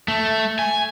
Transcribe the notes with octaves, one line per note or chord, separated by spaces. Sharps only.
A3
G#5